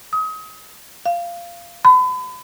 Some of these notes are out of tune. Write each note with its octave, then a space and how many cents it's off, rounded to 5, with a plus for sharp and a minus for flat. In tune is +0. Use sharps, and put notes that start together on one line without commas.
D#6 +30
F5 -15
B5 +35